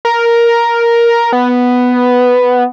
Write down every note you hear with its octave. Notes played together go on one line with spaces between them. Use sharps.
A#4
B3